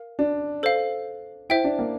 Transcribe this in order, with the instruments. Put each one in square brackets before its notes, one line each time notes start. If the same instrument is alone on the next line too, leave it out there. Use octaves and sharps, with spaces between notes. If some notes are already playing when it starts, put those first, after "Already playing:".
Already playing: [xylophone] A#4 F5
[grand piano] D4
[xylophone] A4 C5 F5
[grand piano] E4 [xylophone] C5 E5 G5
[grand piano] D4
A#3